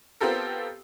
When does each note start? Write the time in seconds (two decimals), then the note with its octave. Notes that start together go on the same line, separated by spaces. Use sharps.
0.21 B3 C4 F4 G4 A4 A#4